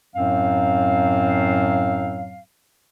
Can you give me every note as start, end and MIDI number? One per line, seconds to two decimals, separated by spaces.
0.15 2.39 42
0.15 2.39 45
0.15 2.39 54
0.15 2.39 60
0.15 2.39 77